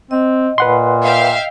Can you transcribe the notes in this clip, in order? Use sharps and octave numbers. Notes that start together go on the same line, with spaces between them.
C4 D#5
A#2 B4 F#5 C6
E5 F5 G5